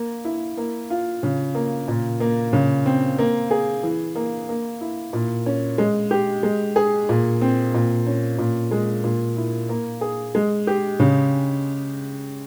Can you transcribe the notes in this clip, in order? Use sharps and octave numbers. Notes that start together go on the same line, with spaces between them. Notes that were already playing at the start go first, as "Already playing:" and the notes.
Already playing: A#3
E4
A#3
F4
C#3
A#3
A#2
A#3
C#3
C4
A#3
G#4
E3
A#3
A#3
E4
A#2
C#4
G#3
G4
G#3
G#4
A#2
C4
A#2
C#4
A#2
G#3
A#2
E4
A#3
G#4
G#3
G4
C#3